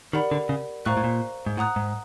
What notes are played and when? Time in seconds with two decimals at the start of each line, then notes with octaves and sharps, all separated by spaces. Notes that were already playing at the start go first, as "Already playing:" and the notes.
0.13 D#3 G4 A#4 D5 F#5 B5
0.31 D3
0.49 C#3
0.86 A2 C5 F5 A#5 C#6 F#6
0.97 A2
1.04 A#2
1.46 G#2
1.57 A2 F#5 A#5 D#6 F#6
1.76 G#2